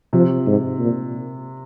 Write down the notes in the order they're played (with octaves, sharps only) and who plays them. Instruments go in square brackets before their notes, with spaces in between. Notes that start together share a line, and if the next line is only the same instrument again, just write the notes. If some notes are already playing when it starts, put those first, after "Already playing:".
[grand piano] C3 [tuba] F3
[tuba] G#2
A#2